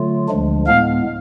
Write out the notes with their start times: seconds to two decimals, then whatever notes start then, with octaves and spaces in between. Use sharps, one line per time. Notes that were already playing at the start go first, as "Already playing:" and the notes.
Already playing: D3 F#3 A3 F4
0.28 D2 D3 F3 G#3 D4
0.67 A2 G#3 B3 F5